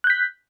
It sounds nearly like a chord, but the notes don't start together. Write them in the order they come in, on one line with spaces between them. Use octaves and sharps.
F#6 G6 B6